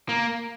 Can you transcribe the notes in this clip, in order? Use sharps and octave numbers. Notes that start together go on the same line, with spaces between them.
A#3